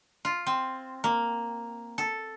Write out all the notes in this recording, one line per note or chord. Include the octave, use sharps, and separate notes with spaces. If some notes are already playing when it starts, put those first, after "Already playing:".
F4
C4
A#3
A4